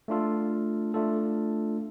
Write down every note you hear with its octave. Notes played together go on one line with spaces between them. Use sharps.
A3 D4 F4 A4
A3 D4 F4 A4